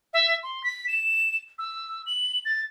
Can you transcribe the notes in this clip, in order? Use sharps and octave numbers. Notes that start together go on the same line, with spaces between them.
E5
C6
B6
E7
E6
F#7
A6